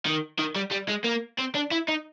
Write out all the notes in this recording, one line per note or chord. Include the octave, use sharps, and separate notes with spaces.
D#3
D#3
G3
G3
G#3
A#3
C4
D4
E4
D#4